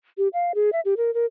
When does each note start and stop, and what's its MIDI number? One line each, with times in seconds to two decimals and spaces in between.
0.18 0.28 67
0.33 0.52 77
0.55 0.70 68
0.73 0.80 76
0.85 0.94 67
0.97 1.13 70
1.14 1.26 70